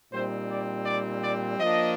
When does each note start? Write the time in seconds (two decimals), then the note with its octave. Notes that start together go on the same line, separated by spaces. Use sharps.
0.12 A#2 G3 C4 D#4 C5
0.50 D5
0.86 D5
1.22 D5
1.59 F3 A#3 D4 F4 D#5